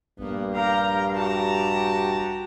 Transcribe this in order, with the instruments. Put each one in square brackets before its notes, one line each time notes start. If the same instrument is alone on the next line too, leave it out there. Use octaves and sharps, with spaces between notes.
[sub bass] A#1 [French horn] G2 [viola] A#3 B3
[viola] G4 A#5 [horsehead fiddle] A#4 F5
[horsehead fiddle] F#4 G4 [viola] A5 A#5